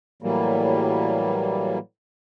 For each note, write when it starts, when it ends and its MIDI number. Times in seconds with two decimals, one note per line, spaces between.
0.22 1.78 45
0.22 1.78 52
0.22 1.78 54
0.22 1.78 55
0.22 1.78 58